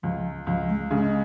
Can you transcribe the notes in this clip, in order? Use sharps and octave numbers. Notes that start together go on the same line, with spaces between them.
C#2 F3
C#2 F3
G#3
C#3 G#3